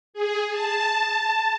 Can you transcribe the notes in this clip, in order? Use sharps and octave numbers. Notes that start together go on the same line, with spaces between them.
G#4
A5